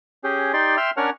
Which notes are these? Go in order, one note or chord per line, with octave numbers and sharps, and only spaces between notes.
C#4 G4 G#4
D#4 G4 D5 C6
E5 G5 C6 E6 F6
C#4 D4 A#4 C#5 F#5 F6